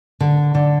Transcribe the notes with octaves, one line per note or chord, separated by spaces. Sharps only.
D3
D3